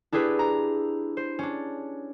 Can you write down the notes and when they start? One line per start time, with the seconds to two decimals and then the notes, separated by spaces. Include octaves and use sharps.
0.12 D4 E4 G4 G#4 B4
0.39 A#5
1.17 C5
1.39 C#4 D4